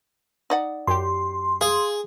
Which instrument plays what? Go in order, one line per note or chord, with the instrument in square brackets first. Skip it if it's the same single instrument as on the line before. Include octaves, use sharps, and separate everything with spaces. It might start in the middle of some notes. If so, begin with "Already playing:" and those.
[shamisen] D#4 D5 F#5
[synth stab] F#2 G4 [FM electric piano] C6
[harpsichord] G#4 [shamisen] F5